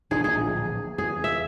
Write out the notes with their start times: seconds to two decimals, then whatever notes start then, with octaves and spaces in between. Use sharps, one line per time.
0.11 E1 D#3 D4 G#4
0.24 D1 A#1 E2 G#4
0.98 E2 G#4
1.24 E5